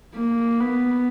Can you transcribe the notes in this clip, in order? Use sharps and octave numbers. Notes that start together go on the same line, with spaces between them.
A#3
B3